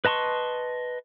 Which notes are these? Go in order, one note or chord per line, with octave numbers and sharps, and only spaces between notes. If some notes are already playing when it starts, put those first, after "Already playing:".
B4 D#5 A5 C6 C#6